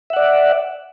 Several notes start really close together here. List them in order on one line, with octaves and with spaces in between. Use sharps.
E5 F#5 D5